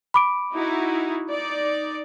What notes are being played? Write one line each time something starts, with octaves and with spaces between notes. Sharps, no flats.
B5 D6 D7
D#4 E4 F#4
D#4 D5